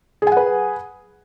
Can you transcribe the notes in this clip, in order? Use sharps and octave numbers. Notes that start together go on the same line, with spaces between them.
G#4 B4 F#5 G#5